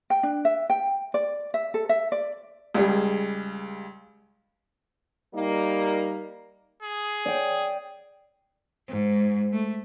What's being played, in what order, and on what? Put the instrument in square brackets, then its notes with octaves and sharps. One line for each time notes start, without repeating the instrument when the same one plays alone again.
[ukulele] G5
D4
E5
G5
D5
E5
A4
E5
D5
[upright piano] C#2 G3 G#4
[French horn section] G3 A#3 D#4
[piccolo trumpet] G#4
[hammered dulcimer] D5 G5
[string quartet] G#2
A3